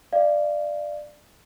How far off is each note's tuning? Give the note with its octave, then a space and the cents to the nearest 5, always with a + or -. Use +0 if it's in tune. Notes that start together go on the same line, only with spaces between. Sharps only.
D5 +15 F5 -30